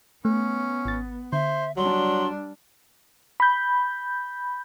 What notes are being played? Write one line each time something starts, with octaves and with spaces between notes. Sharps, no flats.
A3 B3 C#4
G#1 A6
D3 C5 E5
F#3 G3 D4 C6
B5 G6